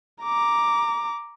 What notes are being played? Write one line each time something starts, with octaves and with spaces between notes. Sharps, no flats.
A#5 D6